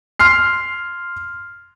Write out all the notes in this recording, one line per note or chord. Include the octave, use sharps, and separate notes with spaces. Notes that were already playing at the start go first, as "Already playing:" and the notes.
C6 F6 C7